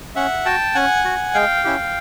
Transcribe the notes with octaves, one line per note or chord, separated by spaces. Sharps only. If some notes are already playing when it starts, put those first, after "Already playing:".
C#4 E5 F#5
F#4 G5 A5
C#4 F#5 G#5
F#4
G#3 F5 G5
C#4 E4 G4